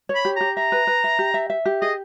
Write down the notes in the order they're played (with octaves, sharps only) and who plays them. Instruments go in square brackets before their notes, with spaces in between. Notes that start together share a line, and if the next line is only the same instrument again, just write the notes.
[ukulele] C#5
[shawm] B5
[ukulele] G4
[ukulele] G4 [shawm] A#5
[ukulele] E5 [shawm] A#5
[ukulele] B4
B4
E5
G4
E5
E5
G4
[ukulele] G#4 [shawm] D#5